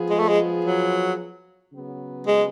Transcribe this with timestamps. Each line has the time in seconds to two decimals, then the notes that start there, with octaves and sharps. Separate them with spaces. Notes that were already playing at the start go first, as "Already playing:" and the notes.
Already playing: F3 B3 F4 G#4
0.10 G#3
0.19 A3
0.28 G#3
0.65 F#3
1.73 C#3 F#3 B3
2.27 G#3